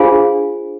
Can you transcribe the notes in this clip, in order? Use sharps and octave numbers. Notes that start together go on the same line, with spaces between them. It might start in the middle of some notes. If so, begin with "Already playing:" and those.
Already playing: D4 F4 G#4 C5 F5 G#5